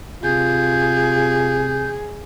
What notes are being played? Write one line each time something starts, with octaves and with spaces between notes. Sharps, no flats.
C3 F4 G#4 G6